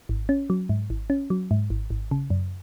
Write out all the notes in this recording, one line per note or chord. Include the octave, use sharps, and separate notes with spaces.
G#1
C#4
F#3
G#2
G#1
C#4
F#3
G#2
G#1
G#1
C#3
F#2